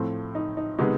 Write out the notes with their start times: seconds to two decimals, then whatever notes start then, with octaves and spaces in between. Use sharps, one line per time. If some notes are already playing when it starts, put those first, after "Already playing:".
Already playing: A2 F3 A3 C4
0.35 D#4
0.57 D#4
0.78 C3 D#3 G#3 B3 D#4